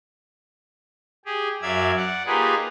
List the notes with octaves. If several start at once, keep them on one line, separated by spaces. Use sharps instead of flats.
G4 G#4
F#2 F#3 D5 E5 F5 G#6
D5 F#5
A#3 D#4 F4 G4 G#4 B4